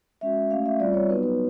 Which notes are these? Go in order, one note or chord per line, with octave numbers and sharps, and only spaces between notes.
G#3 C#4 F#4 E5
A3 C#4 F#4 F5
E5
G3 C4 F4 D5
C#5
F#3 B3 D#4 F#4 B4
B4